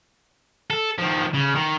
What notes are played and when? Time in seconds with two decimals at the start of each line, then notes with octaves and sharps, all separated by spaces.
0.70 A4
0.99 D#3 F3
1.34 C#3
1.55 D#3